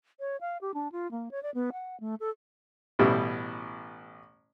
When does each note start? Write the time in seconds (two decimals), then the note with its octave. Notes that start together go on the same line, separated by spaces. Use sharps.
0.20 C#5
0.41 F5
0.61 G4
0.74 D4
0.92 F4
1.11 A#3
1.31 C#5
1.43 D5
1.54 B3
1.73 F#5
2.00 A3
2.20 A4
2.99 A1 B2 G3 E4